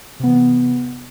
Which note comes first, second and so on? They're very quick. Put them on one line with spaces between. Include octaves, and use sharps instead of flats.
C3 B3 E3